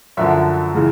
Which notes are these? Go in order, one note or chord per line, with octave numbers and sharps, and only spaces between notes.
F#2 D3 F3 E5
C#3 E3 G#3